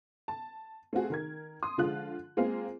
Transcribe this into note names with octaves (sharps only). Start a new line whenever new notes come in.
A5
A3 C4 F4 F#4 G#4
D#3 A#4 G#6
C6 D#6
D3 F3 G#3 F4 F#6
G#3 A#3 C4 F4 G#4 F5